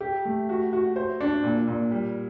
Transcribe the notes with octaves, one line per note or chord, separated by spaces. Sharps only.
G4
A3
F#4
F#4
C5
D4
A#2
A#2
G3